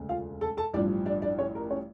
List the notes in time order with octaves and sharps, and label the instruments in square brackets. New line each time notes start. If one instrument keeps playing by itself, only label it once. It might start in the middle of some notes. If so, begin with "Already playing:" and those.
Already playing: [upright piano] E1 D2 C#3
F4 F5
A4 A5
A4 A5
A1 G2 F3 D4 D5
D4 D5
D4 D5
C#4 C#5
A#4
C#4 C#5